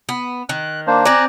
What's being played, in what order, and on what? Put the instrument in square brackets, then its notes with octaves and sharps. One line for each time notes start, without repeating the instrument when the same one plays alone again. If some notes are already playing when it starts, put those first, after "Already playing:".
[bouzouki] B3
[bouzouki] D#3 [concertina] F#6
[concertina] A#3 D4 C5
[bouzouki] C4 D5 [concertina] G#5 A#5 F#6